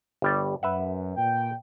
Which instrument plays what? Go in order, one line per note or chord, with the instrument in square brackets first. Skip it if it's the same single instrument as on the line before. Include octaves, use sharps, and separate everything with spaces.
[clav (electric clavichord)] G1 G3 D5
[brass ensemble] F#2 [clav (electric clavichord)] B4 E5 F#5
[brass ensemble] A#2 G5